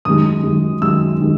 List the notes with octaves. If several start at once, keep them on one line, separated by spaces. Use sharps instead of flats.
F#2 D#3 G#3 D#6
F#2 D#3 G#3
F#2 D#3 G#3 E6
D#3 G#3